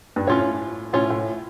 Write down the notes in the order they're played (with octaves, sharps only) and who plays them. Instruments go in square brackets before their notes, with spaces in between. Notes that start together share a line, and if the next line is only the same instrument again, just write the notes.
[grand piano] G2
[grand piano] A2 [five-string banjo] C#4 F4 C#5
[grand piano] A2 [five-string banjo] C#4 F4 C#5
[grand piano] A2